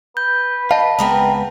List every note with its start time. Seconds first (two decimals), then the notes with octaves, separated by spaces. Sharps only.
0.17 B4 G6
0.71 D#5 F5 A5
0.99 C#2 G#3 B3 C4 A#4 D#5